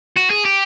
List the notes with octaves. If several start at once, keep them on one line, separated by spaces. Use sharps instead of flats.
F#4
G#4
G4